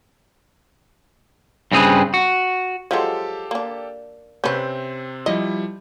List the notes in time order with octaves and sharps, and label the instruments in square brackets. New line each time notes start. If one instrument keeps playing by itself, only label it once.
[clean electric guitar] G2 C#3 C4 D#4 G#4 B4
F#4
[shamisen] F3 F#3 G#3 [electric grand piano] G4 A4 F5
[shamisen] A#3 D4
[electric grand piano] C3 C4 G6 [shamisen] C#4 B4
[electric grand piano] F3 G3 E4 [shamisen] D#5